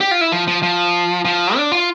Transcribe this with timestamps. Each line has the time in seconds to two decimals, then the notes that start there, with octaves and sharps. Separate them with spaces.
0.01 G4
0.11 F4
0.21 E4
0.32 F3
0.47 F3
0.63 F3
1.25 F3
1.56 D4
1.72 F4